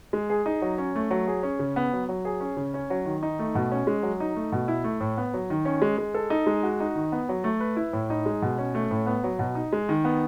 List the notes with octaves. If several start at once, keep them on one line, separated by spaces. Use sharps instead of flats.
G#3
G#4
D#4
F#3
C#4
A3
F#3
G#4
C#4
C#3
B3
F#3
F#3
G#4
C#4
C#3
C#4
F#3
D#3
D#4
A3
B2
C#4
G#3
F#3
D#4
A3
B2
E4
A3
A2
B3
F#3
D#3
C#4
G#3
G#3
A4
D#4
G#3
F#4
D#4
D#3
B3
F#3
A3
B4
E4
A2
D#4
G#3
B2
C#4
A3
A2
B3
F#3
B2
D#4
G#3
D#3
B3